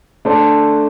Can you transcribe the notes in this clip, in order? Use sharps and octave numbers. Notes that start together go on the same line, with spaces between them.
A3 D4 A4 C5